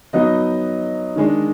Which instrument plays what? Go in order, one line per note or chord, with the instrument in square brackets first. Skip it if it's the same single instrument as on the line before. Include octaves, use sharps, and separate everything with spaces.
[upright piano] F#3 B3 D#4 D#5
D#3 G#3 D4